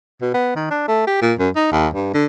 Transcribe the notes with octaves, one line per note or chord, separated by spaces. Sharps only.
B2
B3
D#3
D4
A3
G4
A#2
F#2
D#4
D#2
G2
D3